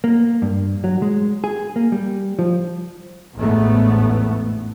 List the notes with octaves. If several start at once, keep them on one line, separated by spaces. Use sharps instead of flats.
A#3
G2
F#3
G#3
G#4
A#3
G3
F3
A1 E2 G#2 A3 B3